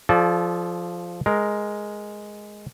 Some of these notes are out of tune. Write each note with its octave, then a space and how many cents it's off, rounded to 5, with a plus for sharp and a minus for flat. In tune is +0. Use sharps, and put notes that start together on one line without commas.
F3 +0 A4 -35 D5 +0
G#3 +0 A#4 +0